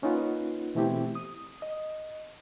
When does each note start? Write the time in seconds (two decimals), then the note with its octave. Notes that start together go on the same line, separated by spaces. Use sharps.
0.02 A#3 C#4 D#4 F4 B4 F#5
0.75 B2 E3 A3 C4 E4 G4
1.15 D#6
1.62 D#5